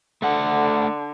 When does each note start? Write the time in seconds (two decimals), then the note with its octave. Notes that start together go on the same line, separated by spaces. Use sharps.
0.22 D3 A3 F#5